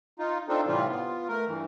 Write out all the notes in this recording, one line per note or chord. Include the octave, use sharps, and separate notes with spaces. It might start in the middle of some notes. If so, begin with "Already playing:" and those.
D#4 F4
C4 D4 D#4 F4 A4
A2 C3 E3 G3 C4 F4
B3 F4
A3 A#4
G2 E3